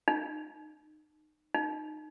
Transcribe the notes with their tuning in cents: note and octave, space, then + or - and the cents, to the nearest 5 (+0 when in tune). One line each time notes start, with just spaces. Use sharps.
D#4 -30
D#4 -20